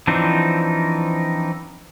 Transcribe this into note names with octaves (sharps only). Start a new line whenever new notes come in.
E3 F3 C4 D4 D#4